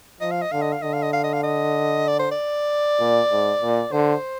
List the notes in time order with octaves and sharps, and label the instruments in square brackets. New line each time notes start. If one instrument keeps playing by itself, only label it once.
[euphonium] F3 [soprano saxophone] D#5
[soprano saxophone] F5
D#5
[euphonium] D3 [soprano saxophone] F5
[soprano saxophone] D#5
F5
[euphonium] D3 [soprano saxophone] D#5
[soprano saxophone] F5
D#5
F5
D#5
F5
D#5
D5
C5
D5
[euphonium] A#2
G#2
A#2
[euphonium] D3 [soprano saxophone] C5